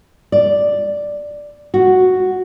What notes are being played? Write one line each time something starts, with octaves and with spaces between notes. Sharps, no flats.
D5
F#4